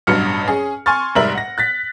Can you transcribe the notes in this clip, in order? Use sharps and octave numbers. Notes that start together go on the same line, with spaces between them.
A1 G2 B2 F#3 F6 C#7
C#4 G#4
G#5 C6 C#6 F6 A6
F1 G#2 G3 A#4 E5 F#7
F#5 A#6
F#6 A6 B6